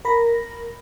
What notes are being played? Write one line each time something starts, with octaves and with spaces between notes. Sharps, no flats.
A#4 B5 A#6